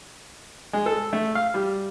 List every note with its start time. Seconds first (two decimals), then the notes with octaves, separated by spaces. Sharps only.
0.73 G#3
0.86 A4
1.13 A3
1.35 F5
1.54 G3